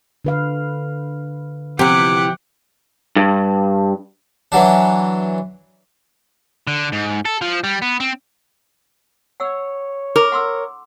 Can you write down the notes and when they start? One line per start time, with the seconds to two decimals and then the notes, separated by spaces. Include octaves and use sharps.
0.25 D3 B4 F5
1.79 C3 E3 F3 G4 F#5 D6
3.16 G2
4.52 E3 F#3 D4
6.67 D3
6.92 G#2
7.25 A4
7.41 F3
7.64 G3
7.82 B3
8.00 C4
9.40 C#5 F#5 E6
10.16 A#4 D6
10.32 F#5 C6 E6